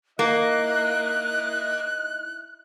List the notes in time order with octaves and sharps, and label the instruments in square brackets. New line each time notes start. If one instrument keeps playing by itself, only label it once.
[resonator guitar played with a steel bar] A#3 [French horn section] D#4 E4 D#5 [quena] F#6